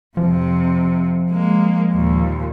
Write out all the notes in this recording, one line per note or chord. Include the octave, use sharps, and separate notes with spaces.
F2 C3 F3
G#3 A#3
D#2 A#2